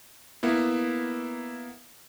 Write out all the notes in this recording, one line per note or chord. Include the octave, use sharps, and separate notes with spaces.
A#3 B3 E4